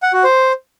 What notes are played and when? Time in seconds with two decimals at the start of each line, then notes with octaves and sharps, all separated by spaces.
0.03 F#5
0.13 F#4
0.24 C5